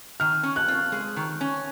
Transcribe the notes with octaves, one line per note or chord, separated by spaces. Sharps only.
D#3 F6
C#4
F#6
F4
G#3
D#3
C#4